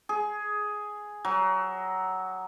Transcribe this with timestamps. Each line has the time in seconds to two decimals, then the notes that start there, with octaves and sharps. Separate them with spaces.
0.09 G#4
1.25 F#3